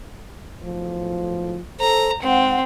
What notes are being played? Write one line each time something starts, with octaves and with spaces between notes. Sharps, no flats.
B1 A2 F3
A4 C5 A#5
G#2 G#3 C4 F#5